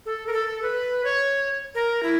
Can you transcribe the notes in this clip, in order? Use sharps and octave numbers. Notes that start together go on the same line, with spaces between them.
A4
A#4
A4
B4
C#5
A#4
E4